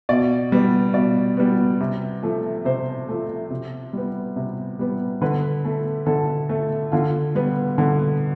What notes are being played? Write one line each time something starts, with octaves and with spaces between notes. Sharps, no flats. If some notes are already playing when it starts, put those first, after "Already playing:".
B2 D5
G3 B3
B2 D5
G3 B3
C3
F3 A3
C3 C5
F3 A3
C3
G3 B3
C3
G3 B3
D3 B4
A3
D3 A4
A3
D3 F4
G3 B3
D3